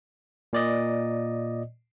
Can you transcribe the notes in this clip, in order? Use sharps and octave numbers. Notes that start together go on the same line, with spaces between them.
A#2 D5 D#5